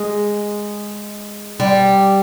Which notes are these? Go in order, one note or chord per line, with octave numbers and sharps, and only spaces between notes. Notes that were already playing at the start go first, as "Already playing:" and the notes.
Already playing: G#3
G3